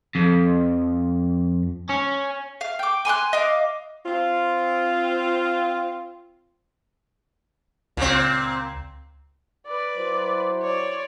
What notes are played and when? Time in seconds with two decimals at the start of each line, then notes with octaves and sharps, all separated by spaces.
0.15 F2
1.89 C#4
2.61 F5
2.79 G5 D6
3.05 G#5 C6 F6 F#6
3.33 D#5 F5 D6
4.06 C4 F4
7.97 C#2 A#2 C4
9.67 B4 D5
9.98 F#3 E4 C5
10.61 C#5 D5